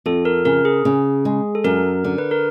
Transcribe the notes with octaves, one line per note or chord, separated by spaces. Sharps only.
F2 A4
A#4
C#3 A#4
G#4
C#3
G#3
A4
F#2 A#4
D3
B4
A#4